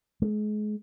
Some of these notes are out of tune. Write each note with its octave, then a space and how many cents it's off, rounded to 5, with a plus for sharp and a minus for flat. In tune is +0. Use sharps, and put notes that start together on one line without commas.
G#3 +30